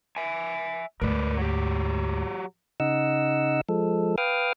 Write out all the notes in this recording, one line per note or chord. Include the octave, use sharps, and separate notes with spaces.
E5 G#5
D2 G#2 A#4 B4 D5
F#3 G4
C#3 D#4 D#5 F#5 E6
F3 G#3 A4
B4 F5 G5 D6 D#6 F6